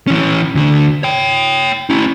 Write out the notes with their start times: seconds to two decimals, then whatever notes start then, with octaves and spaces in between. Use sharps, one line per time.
0.07 E3 C#4
0.55 D2 D3
1.03 C#5 G5
1.90 C#4 E4